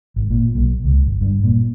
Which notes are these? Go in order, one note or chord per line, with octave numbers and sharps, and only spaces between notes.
G#1
A#2
B1
C#2
G1
G2
A#2